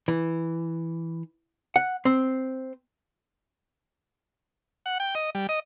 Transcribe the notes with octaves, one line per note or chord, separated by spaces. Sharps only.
E3
F#5
C4
F#5
G5
D#5
G3
D#5